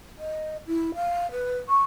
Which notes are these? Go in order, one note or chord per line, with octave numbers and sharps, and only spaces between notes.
D#5
E4
F5
B4
C#6